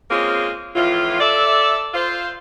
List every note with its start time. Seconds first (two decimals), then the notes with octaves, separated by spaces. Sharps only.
0.10 G#3 A#3 C4 C#4 F4 G#4
0.76 F2 A2 E3 F4
1.20 A4 D5 E5
1.94 F4 C5